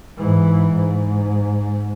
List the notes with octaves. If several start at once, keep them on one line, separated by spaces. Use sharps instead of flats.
G#2 E3
G#2